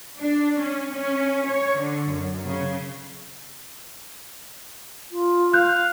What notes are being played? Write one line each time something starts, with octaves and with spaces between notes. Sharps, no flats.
D4
C#4
C#4
C#5
D3
F#2
C#3
F4
F5 F#6 G6